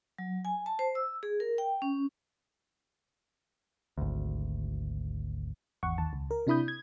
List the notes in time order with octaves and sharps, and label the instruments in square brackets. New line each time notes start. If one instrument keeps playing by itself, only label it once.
[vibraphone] F#3
G#5
A5
C5
E6
G#4
A#4
G5
C#4
[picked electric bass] G#1 D2
[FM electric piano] G#1 E2 F#5 C#6
D#2 A5
C#2
A#4
C3 D4 E4 B5 D#6 G6
G#6